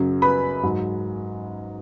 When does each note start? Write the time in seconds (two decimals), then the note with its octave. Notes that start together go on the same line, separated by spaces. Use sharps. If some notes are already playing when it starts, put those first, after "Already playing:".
Already playing: F#2 C#3 F#3
0.22 B4 B5
0.63 G#2 F#3